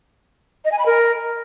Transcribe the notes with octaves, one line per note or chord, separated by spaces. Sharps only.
D#5
G#5
B5
A#4